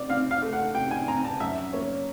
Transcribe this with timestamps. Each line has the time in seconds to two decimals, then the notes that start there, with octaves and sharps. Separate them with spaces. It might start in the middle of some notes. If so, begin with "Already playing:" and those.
Already playing: C3 D5
0.09 C4 F5
0.31 F5
0.42 A3
0.53 F#5
0.75 C3 G5
0.91 G#5
1.08 C4 A#5
1.24 A5
1.40 F#2 E5
1.73 A#3 C#5